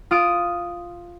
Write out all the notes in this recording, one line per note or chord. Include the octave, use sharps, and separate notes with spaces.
F4 D#6 F6 D7